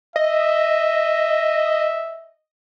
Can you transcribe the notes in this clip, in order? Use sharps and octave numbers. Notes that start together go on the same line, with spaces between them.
D#5 E5